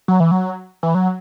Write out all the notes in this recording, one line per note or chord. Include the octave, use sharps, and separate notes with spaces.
F#3
E3
F#3
E3
F#3